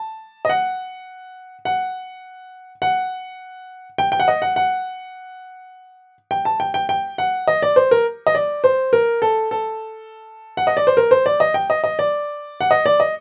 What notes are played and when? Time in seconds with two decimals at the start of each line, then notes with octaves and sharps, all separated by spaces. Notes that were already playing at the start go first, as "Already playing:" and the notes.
Already playing: A5
0.45 D#5
0.49 F#5
1.65 F#5
2.82 F#5
3.98 G5
4.12 G5
4.20 F#5
4.28 D#5
4.42 F#5
4.56 F#5
6.31 G5
6.45 A5
6.60 G5
6.74 G5
6.89 G5
7.18 F#5
7.47 D#5
7.62 D5
7.76 C5
7.91 A#4
8.27 D#5
8.35 D5
8.64 C5
8.93 A#4
9.22 A4
9.51 A4
10.57 F#5
10.67 D#5
10.77 D5
10.87 C5
10.97 A#4
11.11 C5
11.26 D5
11.40 D#5
11.54 G5
11.70 D#5
11.84 D#5
11.99 D5
12.61 F#5
12.71 D#5
12.86 D5
13.00 D#5